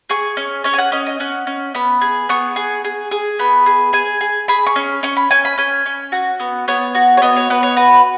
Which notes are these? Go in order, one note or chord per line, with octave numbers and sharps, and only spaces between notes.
G#4 C#6
C#4
C#4 C#5
G#5
F#5
C#4 D#5
D#5
C#4 F#5
C#4
B3 B5
G#4
B3 C#6
G#4
G#4
G#4
B3 B5
G#4
G#4 G#5
G#4
G#4 B5
C#6
C#4
C#4 C#6
B5
C#4 G#5
B5
C#4 G#5
C#4
F#4 F#5
B3
B3 C#5
F#4
C#5
B3 D#5
C#5
B3 B4
C#5
F#4 B4